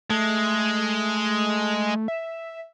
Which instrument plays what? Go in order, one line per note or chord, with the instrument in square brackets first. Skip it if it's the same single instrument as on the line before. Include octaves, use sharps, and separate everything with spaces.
[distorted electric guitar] G#3 [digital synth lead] A3
[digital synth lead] E5